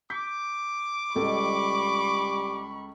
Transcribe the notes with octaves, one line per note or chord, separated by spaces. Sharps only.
D6 G6 B6
C#2 G3 A4 D#5 B5 C#6